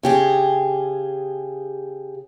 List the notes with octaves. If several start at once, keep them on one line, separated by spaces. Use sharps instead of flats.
C#3 G4 G#4